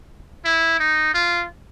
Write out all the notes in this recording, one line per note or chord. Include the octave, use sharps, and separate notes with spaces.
E4
D#4
F4